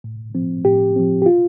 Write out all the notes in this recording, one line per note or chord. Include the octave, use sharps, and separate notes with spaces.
A2
F3 C4
A2 G4
F3 C4
G4
F4